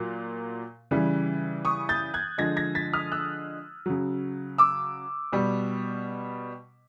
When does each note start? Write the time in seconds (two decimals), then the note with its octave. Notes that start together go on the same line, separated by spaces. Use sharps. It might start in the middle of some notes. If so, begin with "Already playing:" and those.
Already playing: A#2 F#3
0.91 C#3 E3 G3
1.65 C#6 D#6
1.89 G6 A6
2.14 F#6 G#6
2.38 D3 F3 G#3 G#6 A#6
2.57 G#6 A#6
2.75 A6 B6
2.93 D#6 F6
3.12 E6 F#6
3.86 C#3 F#3
4.58 D6 E6
5.32 B2 G3